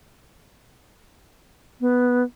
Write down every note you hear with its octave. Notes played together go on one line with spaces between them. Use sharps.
B3